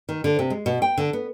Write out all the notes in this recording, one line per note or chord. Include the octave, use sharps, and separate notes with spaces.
D#3
D3
C3
G#3
B2
G5
D3
B3